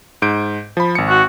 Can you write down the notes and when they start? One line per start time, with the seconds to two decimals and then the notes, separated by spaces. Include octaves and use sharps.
0.22 G#2 G6 D7
0.77 F3 B5
0.95 G#1 C#7
1.09 F#4